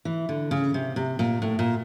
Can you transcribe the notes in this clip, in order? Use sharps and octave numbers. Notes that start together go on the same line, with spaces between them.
E3
D3
C#3
C3
C3
A#2
A2
A#2